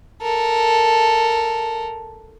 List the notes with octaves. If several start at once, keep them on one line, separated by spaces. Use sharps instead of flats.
A4 A#4